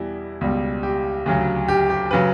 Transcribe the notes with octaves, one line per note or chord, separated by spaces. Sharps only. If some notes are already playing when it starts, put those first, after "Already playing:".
Already playing: E2 B2 G3 E4
C#2 B2 G3
G4
D2 C#3 F#3
G4
G4
C#3 F#3 B4